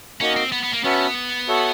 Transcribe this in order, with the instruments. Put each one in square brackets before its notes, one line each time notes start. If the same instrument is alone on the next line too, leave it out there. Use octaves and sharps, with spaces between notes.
[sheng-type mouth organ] A#3 D#4 F#4 A#4 D#5 [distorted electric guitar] C#4
[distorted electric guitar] C4
B3
B3
A#3
[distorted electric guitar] B3 [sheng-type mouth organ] C#4 F#4 B4 E5 A5
[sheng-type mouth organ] F#4 A4 C#5 E5